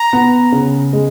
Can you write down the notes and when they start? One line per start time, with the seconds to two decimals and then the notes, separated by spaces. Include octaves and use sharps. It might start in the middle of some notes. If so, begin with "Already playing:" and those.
Already playing: A#5
0.13 B3
0.52 C#3
0.93 G#3